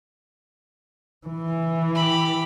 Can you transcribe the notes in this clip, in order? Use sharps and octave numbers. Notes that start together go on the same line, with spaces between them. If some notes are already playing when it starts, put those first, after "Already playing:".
E3
G4 B5